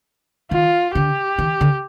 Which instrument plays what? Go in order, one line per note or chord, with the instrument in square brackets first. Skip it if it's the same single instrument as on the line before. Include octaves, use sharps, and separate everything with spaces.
[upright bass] D#3 [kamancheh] F4
[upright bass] D3 [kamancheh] G4
[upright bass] D#3
D3